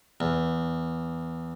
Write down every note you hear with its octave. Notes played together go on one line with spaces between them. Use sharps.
E2